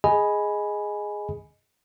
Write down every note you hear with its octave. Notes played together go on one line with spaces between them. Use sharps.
G#4 D#5 G#5 B5